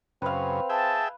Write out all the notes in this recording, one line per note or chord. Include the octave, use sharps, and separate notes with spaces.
F#2 C#3 C4 B4 F5
G#4 E5 G5 A5